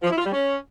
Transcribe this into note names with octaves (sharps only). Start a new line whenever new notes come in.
F3
E4
F4
G3
C#4